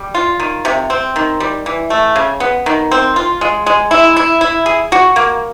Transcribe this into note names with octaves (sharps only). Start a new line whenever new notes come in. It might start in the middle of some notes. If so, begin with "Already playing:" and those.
Already playing: G3
F4
D#3
C3
C4
D#3
G3
E3
A3
C#3
B3
D#3
C4
F4
G#3
G#3
E4
E4
E4
G#4
F#4
A#3